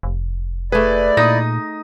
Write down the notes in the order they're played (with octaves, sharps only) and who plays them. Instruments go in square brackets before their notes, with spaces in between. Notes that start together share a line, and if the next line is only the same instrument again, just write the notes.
[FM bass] F1
[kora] A3 G#4 [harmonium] E4 D5 [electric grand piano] B4
[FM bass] A#2 [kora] D#4 [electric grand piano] D#6 A#6